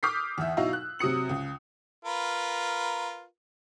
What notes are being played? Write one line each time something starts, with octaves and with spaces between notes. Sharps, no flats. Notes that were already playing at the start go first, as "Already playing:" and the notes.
D6 D#6 F6 G6 B6 C7
E2 E5
B2 F#3 D#4 E4 F5 E6
F#6
C3 F#3 D#6 C#7 F#7
C#2
F4 A#4 B4